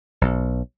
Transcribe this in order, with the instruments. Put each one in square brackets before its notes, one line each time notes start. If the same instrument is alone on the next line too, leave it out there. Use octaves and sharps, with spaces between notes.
[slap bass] B1